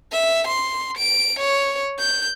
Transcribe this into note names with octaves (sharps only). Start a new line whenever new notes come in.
E5
C6
D7
C#5
G6